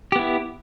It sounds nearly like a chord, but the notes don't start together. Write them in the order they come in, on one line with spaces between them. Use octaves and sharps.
G4 B3 E4